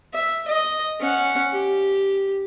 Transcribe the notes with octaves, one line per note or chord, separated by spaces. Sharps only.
E5
D#5
C#4 F#5
G4